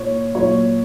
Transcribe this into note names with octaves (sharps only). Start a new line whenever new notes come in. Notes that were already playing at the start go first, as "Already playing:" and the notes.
Already playing: A#2 C#5
A#2 F#3 C#5